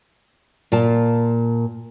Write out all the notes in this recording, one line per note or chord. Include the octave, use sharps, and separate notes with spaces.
A#2 F4 A5